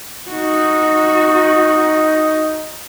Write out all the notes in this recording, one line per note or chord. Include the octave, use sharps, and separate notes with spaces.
D#4 F#4